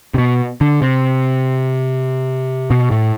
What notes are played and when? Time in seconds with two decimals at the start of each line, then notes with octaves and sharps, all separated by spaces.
0.14 C3
0.18 B2
0.61 D3
0.82 C3
2.70 B2
2.91 A2